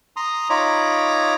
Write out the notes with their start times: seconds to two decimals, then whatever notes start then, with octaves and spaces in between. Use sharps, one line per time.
0.16 A#5 C6 D#6
0.50 D#4 F4 C#5 A#5 B5 D6